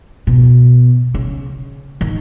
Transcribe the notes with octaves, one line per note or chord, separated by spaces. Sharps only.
B2
C#3
D#3